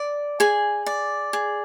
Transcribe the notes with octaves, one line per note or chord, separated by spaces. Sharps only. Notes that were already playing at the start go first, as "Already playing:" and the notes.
Already playing: D5
G#4 G#5
D5
G#4